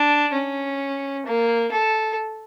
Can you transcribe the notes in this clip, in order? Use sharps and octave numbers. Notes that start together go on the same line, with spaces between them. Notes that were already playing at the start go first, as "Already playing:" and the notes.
Already playing: D4
C#4
A#3
A4